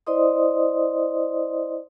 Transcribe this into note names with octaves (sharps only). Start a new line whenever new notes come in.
E4 C5 D5 D#5 C6 D#6